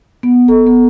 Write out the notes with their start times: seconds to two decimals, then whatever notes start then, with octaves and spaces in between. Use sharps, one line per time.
0.23 B3
0.48 A4
0.67 B3